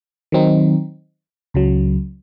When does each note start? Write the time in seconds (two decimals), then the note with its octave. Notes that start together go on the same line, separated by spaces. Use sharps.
0.32 D#3 F#3 C4 D#4
1.54 C#2 C#3 F#3